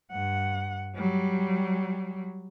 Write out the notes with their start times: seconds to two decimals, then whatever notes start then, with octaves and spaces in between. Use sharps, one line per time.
0.11 G2 F#5
0.95 F#3 G3